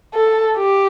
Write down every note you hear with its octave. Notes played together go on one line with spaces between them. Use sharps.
A4
G4